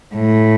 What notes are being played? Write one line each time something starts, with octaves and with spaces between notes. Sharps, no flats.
A2